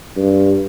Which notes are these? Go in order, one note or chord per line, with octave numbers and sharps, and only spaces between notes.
G2